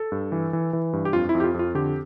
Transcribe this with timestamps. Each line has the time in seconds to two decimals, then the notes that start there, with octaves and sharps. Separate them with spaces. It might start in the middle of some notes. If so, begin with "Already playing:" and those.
Already playing: A4
0.12 G2
0.32 E3
0.53 E3
0.73 E3
0.93 G2
1.05 G4
1.13 F2 F4
1.29 E4
1.35 F2
1.40 G4
1.44 F4
1.54 F2 F4
1.75 D3 G4